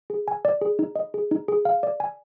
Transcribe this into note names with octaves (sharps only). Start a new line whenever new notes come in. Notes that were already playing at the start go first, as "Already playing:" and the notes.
G#4
G#5
D5
G#4
D#4
D#5
G#4
D#4
G#4
F5
D5
G#5